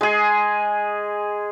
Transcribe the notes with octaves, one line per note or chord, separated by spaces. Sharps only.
G#3 G#4